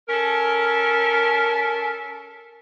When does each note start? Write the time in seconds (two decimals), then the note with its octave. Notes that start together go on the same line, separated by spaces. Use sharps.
0.09 C#4 A4 A#4